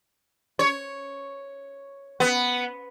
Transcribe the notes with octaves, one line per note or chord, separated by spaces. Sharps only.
C#5
B3